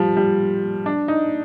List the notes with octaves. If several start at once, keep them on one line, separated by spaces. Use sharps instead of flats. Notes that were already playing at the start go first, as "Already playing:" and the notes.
Already playing: F3 G3
G3
D4
D#4